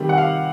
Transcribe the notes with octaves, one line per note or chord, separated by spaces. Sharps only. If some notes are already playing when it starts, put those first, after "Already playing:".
Already playing: C3 D#3 G3
F#5
F5